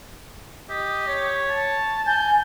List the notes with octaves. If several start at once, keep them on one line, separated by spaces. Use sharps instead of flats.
G4 D#5
C#5
A5
G#5 G6